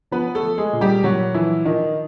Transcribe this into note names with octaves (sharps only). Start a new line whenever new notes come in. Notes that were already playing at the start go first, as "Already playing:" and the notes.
F3 B3 B4
A3 A4
F3
G#3 G#4
A#2
G3 G4
A#2 F#3 F#4
E3 F3 E4
D#3 F3 D#4